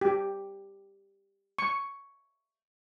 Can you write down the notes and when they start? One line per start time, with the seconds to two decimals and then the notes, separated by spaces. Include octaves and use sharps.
0.01 G4
1.58 C#6